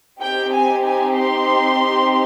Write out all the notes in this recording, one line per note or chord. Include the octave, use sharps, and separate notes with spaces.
C4 D#4 G4 G5
G#5
G#5
C6